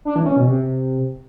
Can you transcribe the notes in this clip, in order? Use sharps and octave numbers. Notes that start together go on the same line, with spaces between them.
D4
E3
C#4
B2
C3